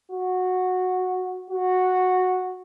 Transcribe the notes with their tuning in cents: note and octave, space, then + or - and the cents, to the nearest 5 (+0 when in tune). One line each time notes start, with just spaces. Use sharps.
F#4 -10
F#4 -5